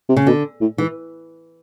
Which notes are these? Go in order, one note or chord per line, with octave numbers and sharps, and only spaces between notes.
C3
C#3
B2 D3
A2
G#2 E3